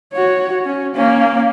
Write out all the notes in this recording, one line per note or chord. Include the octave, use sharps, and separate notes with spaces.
F#4 C#5
C#4
A#3 C#4